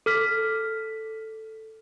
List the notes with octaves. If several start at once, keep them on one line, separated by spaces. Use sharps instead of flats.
A4 F6 B6